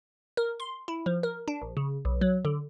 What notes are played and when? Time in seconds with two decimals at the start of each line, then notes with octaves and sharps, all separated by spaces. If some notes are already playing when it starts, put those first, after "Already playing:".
0.37 A#4
0.60 C6
0.88 E4
1.06 F3
1.23 A#4
1.48 D4
1.62 A#1
1.77 C#3
2.05 B1
2.21 F#3
2.45 D3